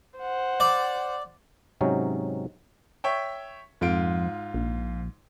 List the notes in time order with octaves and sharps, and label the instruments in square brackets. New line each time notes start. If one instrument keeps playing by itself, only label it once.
[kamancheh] C5 F#5
[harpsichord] D5
[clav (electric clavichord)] G#2 C3 F#3 C#4 D#4
[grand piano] C#5 E5 G5
[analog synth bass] F2 [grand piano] G#2 F4 D7
[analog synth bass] A#1